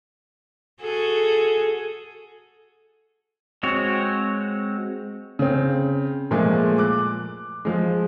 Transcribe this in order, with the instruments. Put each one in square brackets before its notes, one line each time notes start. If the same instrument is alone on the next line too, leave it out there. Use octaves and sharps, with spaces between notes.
[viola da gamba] F#4 G#4 A4
[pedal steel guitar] G#3 C4 F#4 C#5
[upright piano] C#3 C4
A#2 F3 G#3 A3
D6 F#6
F3 G#3